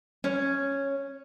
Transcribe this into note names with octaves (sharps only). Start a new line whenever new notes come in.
C#4